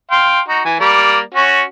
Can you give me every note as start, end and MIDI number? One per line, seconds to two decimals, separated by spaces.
0.11 0.40 77
0.11 0.40 79
0.11 0.40 84
0.48 0.62 63
0.48 0.62 66
0.65 0.76 52
0.65 0.76 80
0.80 1.20 55
0.80 1.20 58
0.80 1.20 74
1.34 1.63 61
1.34 1.63 66